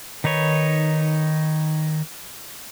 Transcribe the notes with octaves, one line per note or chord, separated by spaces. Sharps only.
D#3 D#4 B4 C#5